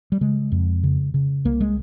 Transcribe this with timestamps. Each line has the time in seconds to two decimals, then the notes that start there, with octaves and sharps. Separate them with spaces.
0.12 G3
0.21 C#3 G#3
0.52 F2
0.83 C#3
1.14 C#3
1.45 C2 A#3
1.60 G#3